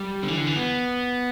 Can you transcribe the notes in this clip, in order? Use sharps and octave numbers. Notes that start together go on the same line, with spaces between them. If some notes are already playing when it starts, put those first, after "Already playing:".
Already playing: G3
D3
E3
D3
E3
B3